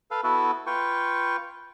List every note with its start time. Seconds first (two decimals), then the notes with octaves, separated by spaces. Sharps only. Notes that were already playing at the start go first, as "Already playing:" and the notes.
0.11 A4 B4 F5
0.24 B3 E4 F#4 A4 B4
0.67 F4 B4 G5 C#6